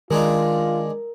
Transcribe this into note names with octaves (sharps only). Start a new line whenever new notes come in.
D#3 G#3 D4 D#4 F4 A#4